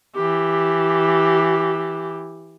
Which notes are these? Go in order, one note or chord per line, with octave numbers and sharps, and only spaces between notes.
E3 G4